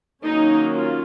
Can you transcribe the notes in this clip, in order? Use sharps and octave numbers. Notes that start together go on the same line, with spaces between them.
D#3 F#3 A#3 C#4 D#4
F4